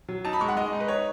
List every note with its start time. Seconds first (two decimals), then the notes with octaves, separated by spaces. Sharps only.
0.09 F#3
0.25 D#4 A5
0.33 B5
0.41 G#3 C#6
0.48 F#5
0.57 G#3 D#5
0.73 D#4
0.80 B4
0.88 C#5